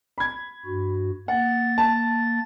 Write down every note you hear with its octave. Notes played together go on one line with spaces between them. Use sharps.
B5 G#6
G2 F#4
A#3 F#5 A6
A5